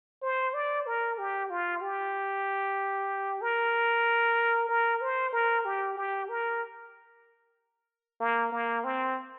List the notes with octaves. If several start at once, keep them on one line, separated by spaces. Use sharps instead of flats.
C5
D5
A#4
G4
F4
G4
A#4
A#4
C5
A#4
G4
G4
A#4
A#3
A#3
C4